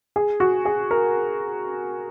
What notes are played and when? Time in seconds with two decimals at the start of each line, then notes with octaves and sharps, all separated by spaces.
0.16 G#4
0.40 F#4
0.65 G#4
0.91 A#4